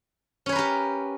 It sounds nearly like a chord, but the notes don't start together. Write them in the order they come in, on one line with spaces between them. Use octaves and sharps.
C#4 C#5 B4 A#4 G4